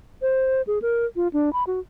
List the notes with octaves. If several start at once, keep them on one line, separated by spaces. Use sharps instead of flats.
C5
G#4
A#4
F4
D4
B5
F#4